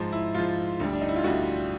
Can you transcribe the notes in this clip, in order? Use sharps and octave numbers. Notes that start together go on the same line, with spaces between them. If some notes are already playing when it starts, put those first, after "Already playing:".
Already playing: G#2 F3
E4
G#2 F3 F4
D2 D3 G3
D4
D#4
E4
F4
D2 D3 G3 F#4